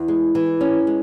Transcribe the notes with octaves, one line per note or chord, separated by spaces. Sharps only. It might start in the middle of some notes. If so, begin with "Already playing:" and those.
Already playing: E2
G#3
E3
C#4
G#3